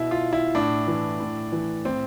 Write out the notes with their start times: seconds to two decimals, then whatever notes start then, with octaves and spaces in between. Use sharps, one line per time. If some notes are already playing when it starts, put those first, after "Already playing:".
Already playing: B2 E4
0.11 F4
0.33 E4
0.55 A2 D4
0.88 E3
1.20 A2
1.52 E3
1.85 A2 C4